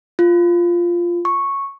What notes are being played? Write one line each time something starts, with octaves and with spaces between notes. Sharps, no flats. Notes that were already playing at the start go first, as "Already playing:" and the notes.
F4
C#6